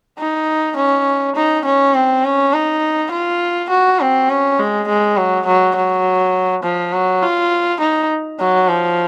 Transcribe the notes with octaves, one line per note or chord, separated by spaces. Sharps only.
D#4
C#4
D#4
C#4
C4
C#4
D#4
F4
F#4
C4
C#4
G#3
G#3
F#3
F#3
F#3
F3
F#3
F4
D#4
F#3
F3